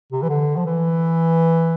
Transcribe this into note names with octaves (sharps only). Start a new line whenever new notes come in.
C3
E3
D3
F3
E3